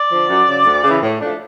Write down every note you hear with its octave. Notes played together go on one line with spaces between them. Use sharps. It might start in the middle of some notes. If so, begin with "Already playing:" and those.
Already playing: D5
D3 F3
F#2
C#3 F#3
D2
C#3 E3
A2
F3 A3 D4